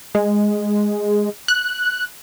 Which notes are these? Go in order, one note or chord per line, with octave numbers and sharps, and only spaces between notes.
G#3
F#6